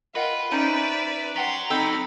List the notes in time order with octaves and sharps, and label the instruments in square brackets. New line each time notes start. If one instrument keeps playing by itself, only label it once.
[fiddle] F4 G5 [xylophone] A#4 D#5 F#5 [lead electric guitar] B4
[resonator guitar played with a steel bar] C#4 D#4 C5 [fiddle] D5 E5
[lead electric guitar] F#3 [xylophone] F#5 G5 B6 [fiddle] C6
[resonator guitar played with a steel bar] C4 D#4 A4 [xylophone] G5 E6 G6 [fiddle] B5